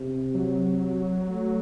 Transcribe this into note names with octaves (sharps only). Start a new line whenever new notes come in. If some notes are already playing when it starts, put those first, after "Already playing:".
Already playing: C3
F#3
A3